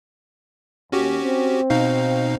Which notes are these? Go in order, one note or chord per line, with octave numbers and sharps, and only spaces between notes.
D#2 C#4 F#4 G4
C4
B2 D#4 F5